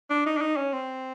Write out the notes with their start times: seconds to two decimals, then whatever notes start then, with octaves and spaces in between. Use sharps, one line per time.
0.10 D4
0.26 D#4
0.37 D4
0.41 D#4
0.57 C#4
0.73 C4